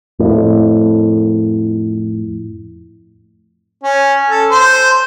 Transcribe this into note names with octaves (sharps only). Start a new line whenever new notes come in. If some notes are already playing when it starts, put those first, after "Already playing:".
F2 A2
C#4
A4
C5